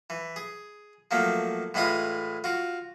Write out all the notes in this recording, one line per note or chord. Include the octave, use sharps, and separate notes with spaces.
E3
G#4
F3 F#3 A3 A#3
A2 E3 G#3 E4 F4 D#6
F4 F#4